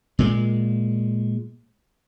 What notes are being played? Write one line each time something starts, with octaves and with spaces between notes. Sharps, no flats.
A#2 G#3